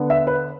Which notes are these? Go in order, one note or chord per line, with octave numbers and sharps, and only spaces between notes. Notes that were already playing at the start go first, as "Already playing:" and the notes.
Already playing: D3 B3 D4
E5
B4